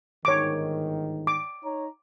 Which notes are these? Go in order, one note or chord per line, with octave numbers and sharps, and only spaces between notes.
G1 G#2 D#3 C#5 D6
D6
D#4 C#5 A#5